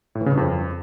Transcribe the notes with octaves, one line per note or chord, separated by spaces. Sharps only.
A2
E3
C#3
G2
F2